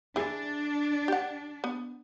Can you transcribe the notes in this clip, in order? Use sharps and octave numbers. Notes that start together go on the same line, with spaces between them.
D4 E4 G#4
G4 F#5
B3